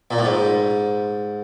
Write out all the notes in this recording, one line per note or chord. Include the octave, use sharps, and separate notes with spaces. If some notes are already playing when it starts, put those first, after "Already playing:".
A#2
A2
G#2